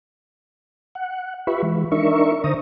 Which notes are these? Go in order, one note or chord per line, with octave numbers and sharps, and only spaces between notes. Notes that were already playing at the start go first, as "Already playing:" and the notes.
F#5
F4 G4 B4 E5 B5 C#6
E3 G#3
D4 D#4 A#4 E5 C#6
D3 C5 A#5 D#6